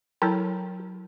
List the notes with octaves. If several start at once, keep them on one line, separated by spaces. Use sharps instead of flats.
F#3 E4 A4 A#4 C#5 G5